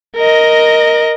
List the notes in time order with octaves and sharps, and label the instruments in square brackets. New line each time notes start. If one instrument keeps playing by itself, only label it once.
[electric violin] A#4 D#5